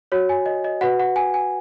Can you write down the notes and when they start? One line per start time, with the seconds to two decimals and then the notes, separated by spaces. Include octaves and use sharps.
0.12 F#4 C#5
0.29 G#5
0.46 D#5
0.64 D#5
0.81 F#4 B4 F#5
0.99 F#5
1.16 G#5
1.34 G#5